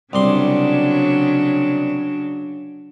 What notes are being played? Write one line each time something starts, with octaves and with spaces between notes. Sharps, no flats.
C2 C#3 F#3 G3 D4 C6